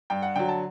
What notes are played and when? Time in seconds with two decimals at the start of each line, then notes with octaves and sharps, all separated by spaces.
0.10 G2 G5
0.22 F#5
0.36 D3 F#3 G5
0.49 A5